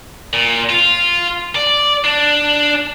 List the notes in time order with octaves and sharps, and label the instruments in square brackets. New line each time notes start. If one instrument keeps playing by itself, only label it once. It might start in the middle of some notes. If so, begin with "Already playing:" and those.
[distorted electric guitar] A#2
F4
D5
D4